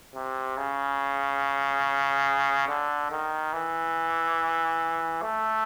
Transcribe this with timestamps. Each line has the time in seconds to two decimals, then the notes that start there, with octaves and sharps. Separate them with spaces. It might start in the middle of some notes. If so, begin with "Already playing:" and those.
0.15 C3
0.57 C#3
2.69 D3
3.11 D#3
3.53 E3
5.22 A3